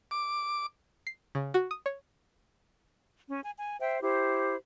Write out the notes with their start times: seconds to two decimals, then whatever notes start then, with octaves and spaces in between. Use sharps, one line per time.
0.11 D6
1.07 C7
1.35 C#3
1.54 F#4
1.71 D#6
1.86 C#5
3.28 C#4
3.44 G#5
3.57 G#5
3.79 C5 E5 G5
4.02 E4 G4 C5